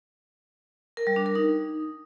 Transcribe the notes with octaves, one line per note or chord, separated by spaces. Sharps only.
A#4
G3
D4
A#4
D#4